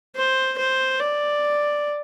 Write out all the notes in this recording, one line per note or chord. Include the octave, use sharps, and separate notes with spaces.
C5
C5
D5